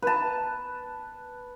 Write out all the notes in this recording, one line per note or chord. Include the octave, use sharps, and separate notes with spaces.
B4 A5